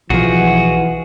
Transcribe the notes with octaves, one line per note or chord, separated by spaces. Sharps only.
B1 E3 F3 F#4 G#4